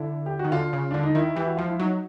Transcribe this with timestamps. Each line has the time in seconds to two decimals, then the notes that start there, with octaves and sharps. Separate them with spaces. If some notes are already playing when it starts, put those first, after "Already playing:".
Already playing: D3 E4
0.26 G4
0.39 F#4
0.45 D#3
0.52 D3 F4
0.73 C#3
0.91 D3 D4
1.03 D#4
1.15 D#3 E4
1.36 E3 G4
1.46 F#4
1.57 F3 F4
1.68 E4
1.79 F#3 D#4